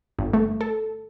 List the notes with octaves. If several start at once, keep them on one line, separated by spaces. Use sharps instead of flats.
G1
A3
A4